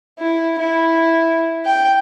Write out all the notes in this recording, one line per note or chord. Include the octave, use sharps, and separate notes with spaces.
E4
E4
G5